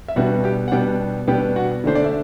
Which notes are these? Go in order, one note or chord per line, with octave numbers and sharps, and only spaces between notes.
E5
B2 G3 B3 D4 F#4 F#5
G4 G5
F#5
B2 G3 B3 D4 G4 G5
B2 G3 B3 D4 G4 G5
F#4 F#5
D3 A3 D4 C5
D5
E5